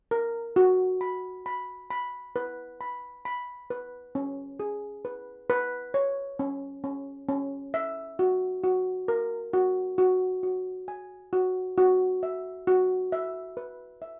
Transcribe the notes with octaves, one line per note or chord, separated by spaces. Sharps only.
A#4
F#4
B5
B5
B5
B4
B5
B5
B4
C#4
G#4
B4
B4
C#5
C#4
C#4
C#4
E5
F#4
F#4
A#4
F#4
F#4
F#4
G#5
F#4
F#4
E5
F#4
E5
B4
E5